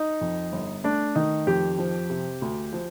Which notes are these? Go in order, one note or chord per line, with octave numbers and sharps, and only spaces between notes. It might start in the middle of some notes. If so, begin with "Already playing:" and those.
Already playing: D#4
F2
G1
A3 D4
D#3 D#4
F2 G4
F3
C3
D2
F3